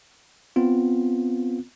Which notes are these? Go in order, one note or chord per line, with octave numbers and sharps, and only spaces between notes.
B3 C4 F4